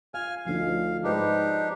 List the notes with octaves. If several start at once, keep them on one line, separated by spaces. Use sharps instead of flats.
F5 G#5 F6
D2 F3 D4 D#4 F5
G#2 G#3 D4 D#4 G4 B4 C5